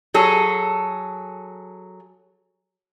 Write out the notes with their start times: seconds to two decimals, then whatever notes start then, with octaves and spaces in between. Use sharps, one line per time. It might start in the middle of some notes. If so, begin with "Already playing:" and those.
0.14 F#3 G#4 A4